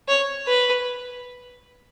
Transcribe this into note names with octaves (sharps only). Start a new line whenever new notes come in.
C#5
B4